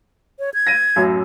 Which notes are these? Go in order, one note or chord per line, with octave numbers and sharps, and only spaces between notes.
C#5
G#6
A#6 D#7
A1 F#2 F#3